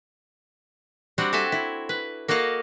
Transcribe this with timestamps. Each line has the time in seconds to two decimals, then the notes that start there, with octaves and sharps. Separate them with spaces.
1.18 G3 C4 D4 F#4
1.33 F#4 A4 E5 G#5 A5
1.52 E4
1.89 B4
2.28 A#3 F#4 A4 D#5 F5